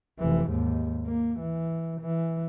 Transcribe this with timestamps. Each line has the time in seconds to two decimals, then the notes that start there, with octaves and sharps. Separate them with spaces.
0.19 F1 E3
0.50 D#2 G#2
1.06 A#3
1.40 E3
2.01 E3